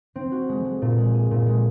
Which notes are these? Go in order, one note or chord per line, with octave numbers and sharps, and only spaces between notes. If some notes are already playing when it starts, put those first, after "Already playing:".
C4
F#4
G#3
G#3
A#2
G#3
G#4
A#2
G#3